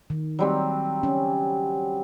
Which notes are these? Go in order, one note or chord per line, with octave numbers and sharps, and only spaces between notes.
D#3
F#3 G3 C4
C#4